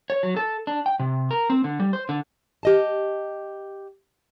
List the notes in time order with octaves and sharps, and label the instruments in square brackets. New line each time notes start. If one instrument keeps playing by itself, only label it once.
[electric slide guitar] C#5
F#3
A4
D4
G5
C3
A#4
C4
D3
G3
C5
D3
[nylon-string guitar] G4 D#5 A5